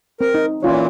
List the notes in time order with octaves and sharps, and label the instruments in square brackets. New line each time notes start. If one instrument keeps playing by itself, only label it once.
[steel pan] C4 [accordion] A#4
[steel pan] D#4
[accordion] A#2 E3 [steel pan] C#4 F4 C#5